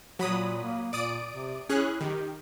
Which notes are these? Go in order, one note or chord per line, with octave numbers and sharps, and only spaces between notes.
A#2 F#3 B5 D#6
A#3
A#2 D5 D#6 D7
C3
C#4 E4 G#4 F#6
D#3 G4